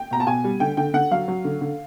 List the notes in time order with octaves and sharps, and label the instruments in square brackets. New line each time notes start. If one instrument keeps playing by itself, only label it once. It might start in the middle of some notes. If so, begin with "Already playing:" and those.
Already playing: [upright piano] G5
B2 A#5
A5
B2 G#5
G3
D3 G5
D3 G5
D3 F#5
F#3 F5
F#3
D3
D3